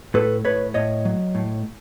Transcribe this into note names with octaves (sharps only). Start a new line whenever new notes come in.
A2 A4 B4
A2 B4 C#5
A2 C#5 D#5
F#3
A2